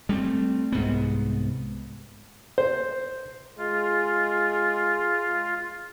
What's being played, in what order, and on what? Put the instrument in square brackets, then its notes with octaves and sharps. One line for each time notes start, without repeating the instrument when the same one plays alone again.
[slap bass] G3 A3 A#3 C4
C2 G#2 B3
[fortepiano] C5
[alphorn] G#3 [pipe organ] F4